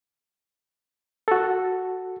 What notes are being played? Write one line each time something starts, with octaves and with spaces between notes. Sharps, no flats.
F#4 A4